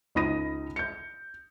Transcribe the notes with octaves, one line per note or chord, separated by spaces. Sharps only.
C#2 D#4 B5 D#6 A#6 D#7
G6 C#7